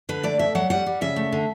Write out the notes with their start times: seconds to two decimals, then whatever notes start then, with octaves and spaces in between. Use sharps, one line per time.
0.09 D3 B4
0.23 A3 D5
0.39 B2 E5
0.55 F#3 F#5
0.70 G3 F#5
0.86 G3
1.01 C#3 E5
1.16 A3
1.32 D3